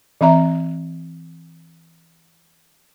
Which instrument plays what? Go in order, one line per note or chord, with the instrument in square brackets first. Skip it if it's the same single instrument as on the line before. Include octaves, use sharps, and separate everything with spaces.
[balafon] E3 C4 E5 A#5